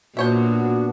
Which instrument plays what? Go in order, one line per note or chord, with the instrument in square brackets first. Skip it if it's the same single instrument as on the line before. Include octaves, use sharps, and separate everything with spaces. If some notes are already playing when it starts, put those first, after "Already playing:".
[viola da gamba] A#2 [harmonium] B3 D4 F#4 [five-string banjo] C5 C#5 E5